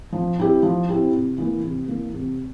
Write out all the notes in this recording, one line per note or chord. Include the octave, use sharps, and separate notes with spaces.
F3
C4 E4 G4
F3
C4 E4 G4
C3
E3 A#3
C3
E3 A#3
C3